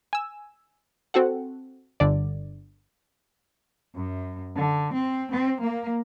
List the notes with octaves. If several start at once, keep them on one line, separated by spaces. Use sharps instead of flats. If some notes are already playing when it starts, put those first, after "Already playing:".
G#5 E6
C4 F#4 A4 F#5
G1 D3 D5
F#2
D3
C4
C4
A#3